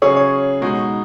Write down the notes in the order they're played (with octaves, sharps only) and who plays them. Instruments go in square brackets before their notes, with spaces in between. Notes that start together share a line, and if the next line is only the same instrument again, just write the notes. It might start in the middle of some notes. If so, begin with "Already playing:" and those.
[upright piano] C#3 F#3 C#4 G#4 [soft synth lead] C#5
[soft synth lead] C#5
[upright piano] B2 G#3 D#4 F#4